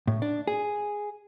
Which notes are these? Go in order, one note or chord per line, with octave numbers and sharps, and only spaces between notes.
A2
D4
G#4